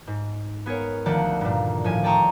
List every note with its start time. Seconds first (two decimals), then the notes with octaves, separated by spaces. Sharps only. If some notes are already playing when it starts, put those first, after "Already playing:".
0.07 G#2
0.66 B3 G#4 A#4 C#5
1.06 D2 D#3 F3 A3 D5 F#5
1.41 G2 A#2
1.84 A2 F3 G#5
2.04 D5 G5 A5 A#5 C#6 D#6